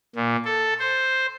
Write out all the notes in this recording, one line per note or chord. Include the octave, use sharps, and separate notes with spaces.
A#2
A4
C5